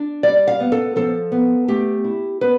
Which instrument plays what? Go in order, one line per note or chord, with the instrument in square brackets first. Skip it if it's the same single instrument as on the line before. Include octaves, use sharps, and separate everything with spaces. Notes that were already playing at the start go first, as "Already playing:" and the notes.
Already playing: [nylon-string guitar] D4
G3 D5
F5
B3
A4
F3 A4
B3
A3 G4
E4
B3 B4